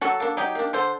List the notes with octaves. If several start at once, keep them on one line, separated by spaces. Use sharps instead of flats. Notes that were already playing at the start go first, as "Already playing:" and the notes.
F#3 F#4 A4
A#3 D4
F#3 D#4 G4
A#3 D4
D3 A4 C5